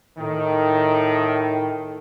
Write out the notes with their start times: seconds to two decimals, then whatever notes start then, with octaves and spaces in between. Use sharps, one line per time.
0.18 A2 D#3